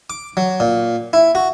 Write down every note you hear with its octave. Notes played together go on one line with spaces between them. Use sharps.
D6
F#3
A#2
E4
F#4